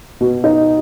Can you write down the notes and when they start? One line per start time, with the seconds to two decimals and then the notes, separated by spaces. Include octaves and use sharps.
0.21 B2
0.44 D#4